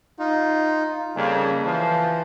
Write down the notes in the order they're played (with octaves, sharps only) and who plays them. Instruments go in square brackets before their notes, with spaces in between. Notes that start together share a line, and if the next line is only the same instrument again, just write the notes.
[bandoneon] D#4 [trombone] F4
[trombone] F2 [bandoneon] C#3 G3 A#3
[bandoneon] E3 [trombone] F3